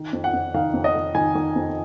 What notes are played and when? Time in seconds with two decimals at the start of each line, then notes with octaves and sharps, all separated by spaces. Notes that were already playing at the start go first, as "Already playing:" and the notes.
Already playing: D#3
0.13 F2
0.24 F#5
0.33 F2
0.54 D#3 F5
0.74 F2
0.84 D#5
0.95 D#3
1.15 D#3 G#5
1.35 D#3
1.56 F2